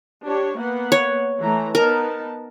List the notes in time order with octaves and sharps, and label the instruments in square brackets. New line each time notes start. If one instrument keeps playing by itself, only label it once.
[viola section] D4 G4 C#5
A#3 B3 F#5
[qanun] C#5
[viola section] E3 A3 A#5
[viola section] B3 D#4 A5 [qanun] A#4